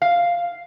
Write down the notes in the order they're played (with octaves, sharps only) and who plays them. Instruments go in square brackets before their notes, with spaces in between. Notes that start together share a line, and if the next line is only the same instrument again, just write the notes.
[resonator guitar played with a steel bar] F5